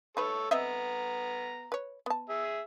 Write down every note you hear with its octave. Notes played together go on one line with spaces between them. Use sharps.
D#4 A4 B4 C#5
B3 C4 D#5 E5 A#5
B4 C#5
B3 A5
G#4 E5